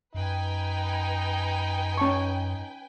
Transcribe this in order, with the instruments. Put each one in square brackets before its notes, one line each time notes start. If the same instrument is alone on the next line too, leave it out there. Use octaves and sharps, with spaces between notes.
[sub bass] F#2 [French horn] D#4 [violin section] B4 G5 G#5
[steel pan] C#4 A5 C#6